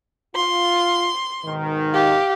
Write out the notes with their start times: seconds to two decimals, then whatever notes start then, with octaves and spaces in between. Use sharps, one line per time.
0.36 F4 C6
1.44 G#2 B2 D#3
1.94 G4 F5